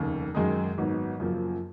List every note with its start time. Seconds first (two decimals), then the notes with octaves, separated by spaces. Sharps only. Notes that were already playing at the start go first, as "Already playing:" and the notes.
Already playing: F1 D#2 C#3
0.34 F#2 D#3 G#3 D#4 G#4
0.77 G#1 G#2 F#3 B3
1.20 F#2 C#3 F3 A#3